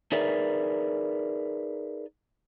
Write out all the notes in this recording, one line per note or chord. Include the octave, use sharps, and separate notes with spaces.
D#4 G#4 A#4 B4 D5 E5